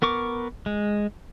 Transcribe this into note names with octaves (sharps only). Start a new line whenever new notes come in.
B3 A#4 C#6 D6
G#3